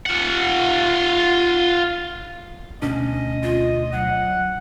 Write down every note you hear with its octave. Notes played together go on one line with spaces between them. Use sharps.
F4 F#5
D2 B2 C#4 D4 D#5
F4
F#3 F#5